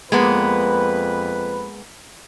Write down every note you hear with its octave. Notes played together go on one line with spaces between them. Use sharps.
F2 G#3 A#3 B3 B4